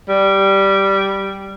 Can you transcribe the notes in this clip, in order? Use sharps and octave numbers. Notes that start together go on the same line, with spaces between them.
G3